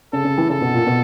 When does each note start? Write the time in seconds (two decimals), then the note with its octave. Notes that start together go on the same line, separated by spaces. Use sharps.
0.13 C#3 A4
0.25 C#3
0.38 E3
0.49 C#3 A4
0.61 B2
0.74 A#2
0.87 B2